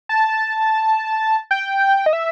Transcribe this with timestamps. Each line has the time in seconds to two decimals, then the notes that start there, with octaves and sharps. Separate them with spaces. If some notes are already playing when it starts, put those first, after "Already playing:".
0.09 A5
1.51 G5
2.06 D#5
2.13 E5